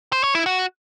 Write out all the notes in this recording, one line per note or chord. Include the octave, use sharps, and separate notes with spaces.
C5
C#5
E4
F#4